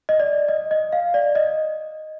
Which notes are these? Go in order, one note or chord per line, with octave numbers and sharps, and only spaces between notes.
D#5
D5
D#5
D#5
F5
D5
D#5